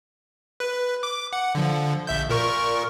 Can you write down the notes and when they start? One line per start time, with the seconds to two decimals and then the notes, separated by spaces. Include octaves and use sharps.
0.60 B4
1.03 D6
1.33 F#5
1.55 D3 F3
2.07 A#1 E5 G6
2.30 A#2 A#4 C#6